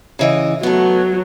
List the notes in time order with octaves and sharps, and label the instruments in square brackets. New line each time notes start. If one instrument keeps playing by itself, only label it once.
[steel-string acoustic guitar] C#3 E3 D#5
[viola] F#3 [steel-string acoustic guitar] A3 B3